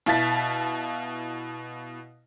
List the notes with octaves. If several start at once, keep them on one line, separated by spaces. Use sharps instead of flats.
B2 E4 F5 A5 A6 B6